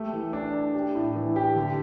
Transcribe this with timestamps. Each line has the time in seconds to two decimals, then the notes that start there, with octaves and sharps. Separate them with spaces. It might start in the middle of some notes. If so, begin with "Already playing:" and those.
Already playing: A3 G4
0.13 E3
0.33 D4
0.54 D4
0.74 G4
0.95 A2
1.15 E3
1.36 G4
1.56 D3